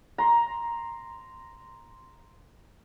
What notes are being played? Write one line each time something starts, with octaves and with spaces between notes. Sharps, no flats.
A#5 C6